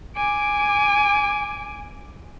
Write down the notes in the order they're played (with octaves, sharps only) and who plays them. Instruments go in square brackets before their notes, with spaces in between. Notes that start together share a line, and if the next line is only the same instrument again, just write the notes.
[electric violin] G#5 D6